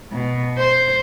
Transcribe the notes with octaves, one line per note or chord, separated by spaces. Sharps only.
B2
C5